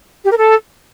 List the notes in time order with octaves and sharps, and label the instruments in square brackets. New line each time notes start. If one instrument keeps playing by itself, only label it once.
[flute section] G4
A#4
A4